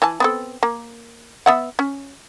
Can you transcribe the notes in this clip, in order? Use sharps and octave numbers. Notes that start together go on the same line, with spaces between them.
E3 G#5 A5
B3 C4 A4
A#3
B3 E5 F#5
C#4